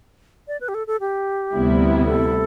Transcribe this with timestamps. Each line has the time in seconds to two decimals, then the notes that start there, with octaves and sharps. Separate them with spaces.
0.48 D5
0.61 B4
0.68 G4
0.74 A4
0.87 A4
1.00 G4
1.53 D2 C3 G3 B3 E4
2.06 A4